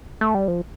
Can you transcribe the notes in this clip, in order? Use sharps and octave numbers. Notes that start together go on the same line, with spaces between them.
A3
G3
F3